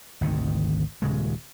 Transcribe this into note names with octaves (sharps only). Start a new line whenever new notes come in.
G#1 D2 C3 D#3
D#1 C#3 G#3